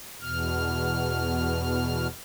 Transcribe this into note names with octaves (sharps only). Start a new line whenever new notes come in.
E2 B2 F6